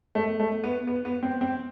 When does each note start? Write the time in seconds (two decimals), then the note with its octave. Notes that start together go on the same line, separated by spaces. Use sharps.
0.15 A3
0.40 A3
0.64 B3
0.87 B3
1.05 B3
1.23 C4
1.41 C4